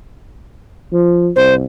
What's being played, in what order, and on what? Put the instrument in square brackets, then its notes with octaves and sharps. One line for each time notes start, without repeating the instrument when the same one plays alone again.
[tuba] F3
[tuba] C2 [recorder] C5